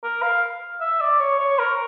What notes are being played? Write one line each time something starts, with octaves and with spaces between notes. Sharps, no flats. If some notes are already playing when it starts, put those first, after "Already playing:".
A#4
F5
E5
D5
C#5
C#5
A#4